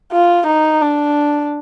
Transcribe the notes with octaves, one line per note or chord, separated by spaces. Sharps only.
F4
D#4
D4